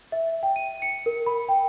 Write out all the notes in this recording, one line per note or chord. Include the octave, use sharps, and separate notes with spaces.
E5
G5
D#7
C#7
A#4
B5
G5